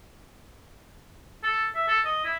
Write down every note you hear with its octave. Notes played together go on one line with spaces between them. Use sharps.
A4
E5
A4
D#5
E4